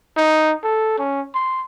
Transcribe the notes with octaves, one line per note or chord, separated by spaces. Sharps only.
D#4
A4
C#4
C6